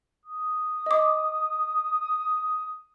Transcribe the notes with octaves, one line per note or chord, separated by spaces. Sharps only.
D#6
D#5 D6